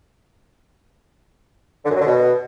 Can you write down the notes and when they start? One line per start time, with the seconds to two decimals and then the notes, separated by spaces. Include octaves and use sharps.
1.85 D3
1.90 F#2
1.95 F#3
2.01 D3
2.06 B2